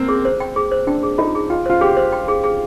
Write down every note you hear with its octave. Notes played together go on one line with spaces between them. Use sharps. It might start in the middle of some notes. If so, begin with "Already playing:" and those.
Already playing: A#3 C4
G#4
C5
G5
G#4
C5
D4 G5
G#4
D#4 F4
G#4
F4 G5
F4 C5
G4 G#4
C5
G5
G#4
G#4